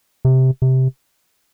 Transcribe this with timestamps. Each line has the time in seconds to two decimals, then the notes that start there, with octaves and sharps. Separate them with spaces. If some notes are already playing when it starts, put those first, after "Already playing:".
0.25 C3
0.62 C3